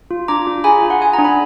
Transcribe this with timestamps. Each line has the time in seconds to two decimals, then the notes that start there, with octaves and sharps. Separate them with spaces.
0.11 F4
0.28 D4 A#5 D6
0.47 F4
0.64 G#4 G#5 B5
0.82 F4
0.90 F#5
1.00 G#4 G#5
1.13 A#5
1.18 D4
1.24 B5